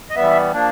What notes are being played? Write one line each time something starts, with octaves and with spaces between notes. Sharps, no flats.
D#5
E3 G3 B3 E5
F3 A#3 D4